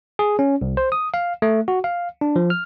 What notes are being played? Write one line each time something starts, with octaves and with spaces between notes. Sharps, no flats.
G#4
C#4
C2
C5
D#6
F5
A3
F#4
F5
D4
F3
F6